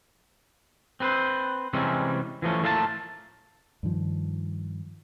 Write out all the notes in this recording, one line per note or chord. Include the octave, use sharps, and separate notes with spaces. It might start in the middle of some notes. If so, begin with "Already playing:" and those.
C4 B4 C5
C3 E3 G3 G#3 C4 C#4
E3 F3 A3 C#4
A2 A3 A#3 F4 G#4 A5
G2 D#3 F3